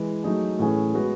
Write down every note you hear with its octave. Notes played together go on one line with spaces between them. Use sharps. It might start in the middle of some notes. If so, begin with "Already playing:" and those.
Already playing: E3 G#3
F#3 A3 D#4 G#4
A2 E3 A3 C#4 G#4
G#3 B3 F#4